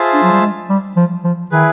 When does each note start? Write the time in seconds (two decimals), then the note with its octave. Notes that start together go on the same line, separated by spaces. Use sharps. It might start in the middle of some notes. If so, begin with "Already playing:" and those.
Already playing: F4 G#4 C5 E5 A5
0.14 D4
0.23 F#3
0.32 G3
0.40 G#3
0.69 G3
0.97 F3
1.24 F3
1.51 D#3 E4 G#4 B4